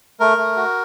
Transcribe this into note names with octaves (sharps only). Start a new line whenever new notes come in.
A3 A#4
A3
F#4